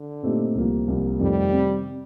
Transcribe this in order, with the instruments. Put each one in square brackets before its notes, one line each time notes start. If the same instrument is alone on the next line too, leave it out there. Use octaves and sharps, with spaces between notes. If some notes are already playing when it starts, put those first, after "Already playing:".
Already playing: [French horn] D3
[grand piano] A#2 A3 C4 D#4 G4
C2 C3 F3 A#3
C2 C3 F3 A#3
[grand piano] F2 C3 D#3 A3 [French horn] G3
[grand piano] C3